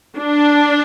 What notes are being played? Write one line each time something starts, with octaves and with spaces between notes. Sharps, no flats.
D4